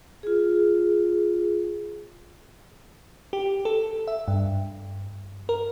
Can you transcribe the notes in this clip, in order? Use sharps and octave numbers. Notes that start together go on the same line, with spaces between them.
F4 G#4
G4
A4
E5
G2
A#4